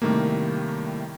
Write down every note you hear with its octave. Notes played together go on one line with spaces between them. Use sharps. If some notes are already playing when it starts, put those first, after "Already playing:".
A2 C3 D#3 G3 A3 A#3